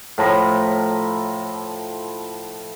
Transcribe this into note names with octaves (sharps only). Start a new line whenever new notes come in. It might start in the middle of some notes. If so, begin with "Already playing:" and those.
A2 F3 A#5 B5